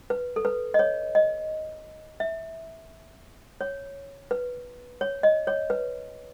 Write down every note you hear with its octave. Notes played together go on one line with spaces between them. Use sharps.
B4
A4
B4
D#5
C#5
D#5
E5
C#5
B4
C#5
D#5
C#5
B4